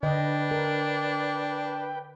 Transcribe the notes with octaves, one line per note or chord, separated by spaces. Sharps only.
D3 D4 B4 D#5 G5
A#4